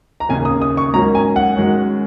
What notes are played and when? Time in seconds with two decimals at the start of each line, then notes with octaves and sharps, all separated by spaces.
0.20 A#5
0.29 D#2 C#3 A#3 G#5
0.45 D#6
0.62 D#6
0.77 C#6
0.94 G#2 F#3 A#3 C#4 A#5
1.15 G#5
1.36 F#5
1.57 F#2 D#3 G#3 C#4